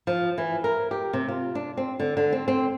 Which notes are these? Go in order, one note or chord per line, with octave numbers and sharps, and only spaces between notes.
F3
E3
A#4
G4
C3
F4
D4
C4
D3
D3
C4
C4